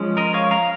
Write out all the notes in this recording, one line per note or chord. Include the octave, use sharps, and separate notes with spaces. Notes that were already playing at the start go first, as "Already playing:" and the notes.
Already playing: F3 G#3 C#4
A#4 D#5
C#5 F5
F5 A#5